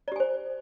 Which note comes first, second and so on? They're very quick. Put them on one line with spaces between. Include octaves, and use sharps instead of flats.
D5 G4 G#5 C5